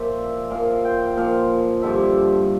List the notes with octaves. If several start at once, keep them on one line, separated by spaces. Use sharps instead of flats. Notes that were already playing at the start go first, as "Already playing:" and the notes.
Already playing: A#2 F3 C5 D5 E5
A#2 F3 F5
G5
A#2 F3 F5
G2 D3 F3 E5